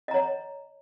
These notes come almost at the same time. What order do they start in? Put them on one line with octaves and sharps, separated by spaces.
D#5 A#5 C#5